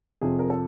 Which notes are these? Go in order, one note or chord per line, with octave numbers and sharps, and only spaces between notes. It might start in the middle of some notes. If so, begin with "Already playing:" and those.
F2 C3 F3 G#4
A#4
A4